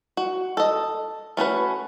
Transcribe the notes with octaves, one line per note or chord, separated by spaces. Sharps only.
F#4
A4 D#5
A3 C#4 F#4 B4